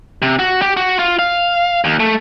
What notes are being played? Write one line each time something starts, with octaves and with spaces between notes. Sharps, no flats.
C3
F#4
G4
F#4
F4
F5
D#2
A3